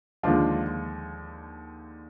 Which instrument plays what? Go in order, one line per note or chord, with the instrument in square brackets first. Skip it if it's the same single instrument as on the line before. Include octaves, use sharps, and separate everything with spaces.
[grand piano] D#2 D3 F3 G#3 D4 F4